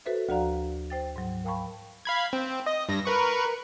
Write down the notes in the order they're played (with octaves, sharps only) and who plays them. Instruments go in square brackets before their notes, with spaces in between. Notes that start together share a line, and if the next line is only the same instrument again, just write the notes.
[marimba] F#4 A4 B4 C5 E5
D2 F3 F#4 D5 F5 A#5
C5 G5 A6
G#2 F#3
A#4 F5 G5 A5 B5 C#6
[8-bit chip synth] F5 B5 G#6
C4
D#5
G2 A#6
A#4 B4 C#6